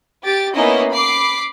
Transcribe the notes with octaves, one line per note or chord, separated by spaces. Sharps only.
G4 A6 D7
A#3 B3 C#4 D#4 E4 D#5
B5 D6 C7